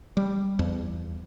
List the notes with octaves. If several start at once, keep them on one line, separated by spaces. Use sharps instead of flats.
G3
E2